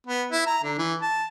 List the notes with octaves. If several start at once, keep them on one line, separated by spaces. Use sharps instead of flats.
B3
E4
A#5
D3
E3
A5